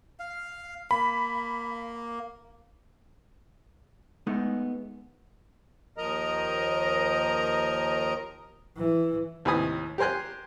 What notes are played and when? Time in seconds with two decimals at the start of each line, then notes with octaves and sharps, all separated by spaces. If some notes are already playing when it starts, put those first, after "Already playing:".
0.20 F5
0.91 A#3 B5
4.27 G#3 A3 B3 D#4
5.98 D#2 F3 A#4 D#5 A#5
8.76 E3
9.45 D#2 A2 C3 B4 G#5 D#6
9.98 G4 A#4 C5 G#5 F#6